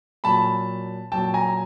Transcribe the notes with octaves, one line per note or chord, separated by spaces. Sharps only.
A#2 F#3 A5 B5
A#2 F#3 G5 A5
G#5 A#5